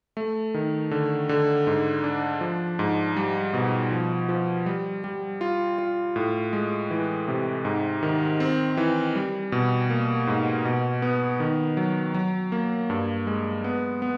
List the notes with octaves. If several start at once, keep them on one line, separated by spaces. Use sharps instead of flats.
A3
D#3
D3
D3
G#2
D4
F3
G#2
G3
B2
F3
F3
G3
G3
F4
F4
A2
G#3
E3
C3
G#2
D#3
C4
E3
G3
B2
A#3
G#2
B2
B3
D#3
F#3
F#3
A#3
G2
G#3
B3
B3